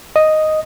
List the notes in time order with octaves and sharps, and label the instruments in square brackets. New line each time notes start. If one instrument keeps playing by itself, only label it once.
[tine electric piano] D#5